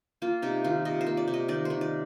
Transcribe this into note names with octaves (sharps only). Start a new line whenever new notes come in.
A#3 F4
C3 D#4
D#3 F4
C3 D#5
C5
A#3
D5
C3
D#5
D#3 D5
D#3 C5
D5